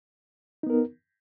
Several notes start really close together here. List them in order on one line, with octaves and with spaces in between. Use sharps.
D#4 B3 A#4